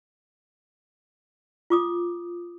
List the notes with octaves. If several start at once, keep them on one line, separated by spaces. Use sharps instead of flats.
F4 D6 D#6